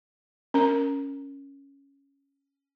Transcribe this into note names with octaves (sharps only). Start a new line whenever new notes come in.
C#4 A#4 A#5